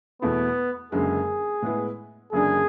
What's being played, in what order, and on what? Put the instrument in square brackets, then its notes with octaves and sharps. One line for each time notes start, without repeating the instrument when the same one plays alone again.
[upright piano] E2 B2 A3 E4 [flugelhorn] B3
[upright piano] F#1 F#2 D3 G#3 [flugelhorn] G#4
[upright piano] A2 G#3 B3 E4
[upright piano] F#1 F#2 D3 G#3 D4 [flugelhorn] G#4